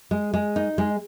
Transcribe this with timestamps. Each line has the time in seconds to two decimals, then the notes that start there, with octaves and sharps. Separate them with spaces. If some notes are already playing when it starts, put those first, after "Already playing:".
0.11 G#3
0.34 G#3
0.56 D#4
0.78 G#3